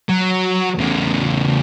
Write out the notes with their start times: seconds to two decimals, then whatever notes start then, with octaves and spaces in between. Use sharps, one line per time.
0.09 F#3
0.78 E2 C#3